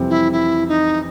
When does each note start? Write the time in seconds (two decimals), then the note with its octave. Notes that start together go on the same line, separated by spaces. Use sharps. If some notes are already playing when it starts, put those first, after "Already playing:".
Already playing: F2 C3 E3 G3 C4
0.10 E4
0.32 E4
0.68 D#4